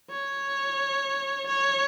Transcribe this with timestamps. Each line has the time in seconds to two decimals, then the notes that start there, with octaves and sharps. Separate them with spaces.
0.10 C#5
1.46 C#5